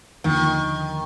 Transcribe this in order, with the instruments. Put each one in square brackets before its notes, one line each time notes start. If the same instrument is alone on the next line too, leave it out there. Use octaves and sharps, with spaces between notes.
[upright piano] D#2 D3 F3 [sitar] D#3